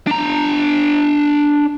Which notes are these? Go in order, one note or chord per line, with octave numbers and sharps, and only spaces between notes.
D4 A#5